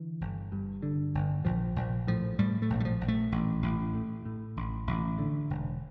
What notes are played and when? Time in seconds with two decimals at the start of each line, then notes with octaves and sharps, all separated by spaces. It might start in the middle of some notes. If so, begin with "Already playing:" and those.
Already playing: D3 E3
0.21 G1
0.52 G2
0.82 D3
1.15 G1
1.45 A#1 F3
1.76 A#1
2.07 A2 F3
2.39 A2 G3
2.62 A3
2.70 A#1
2.80 G3
2.85 F3
3.01 A#1
3.08 A3
3.32 A1
3.62 A1
3.94 A2
4.25 A2
4.57 A1
4.87 A1
5.18 D3
5.50 E1